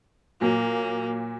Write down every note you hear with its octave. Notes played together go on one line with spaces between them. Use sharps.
A#2 F#3 A#3